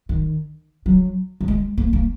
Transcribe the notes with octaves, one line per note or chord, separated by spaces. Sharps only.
D#3
F#3
F#3
G#3
A#3
A#3